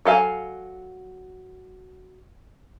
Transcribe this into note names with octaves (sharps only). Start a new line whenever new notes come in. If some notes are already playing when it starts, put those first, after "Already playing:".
F#3 A4 F5 G#5